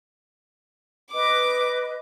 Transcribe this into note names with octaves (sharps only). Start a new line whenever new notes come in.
B4 D#5 D6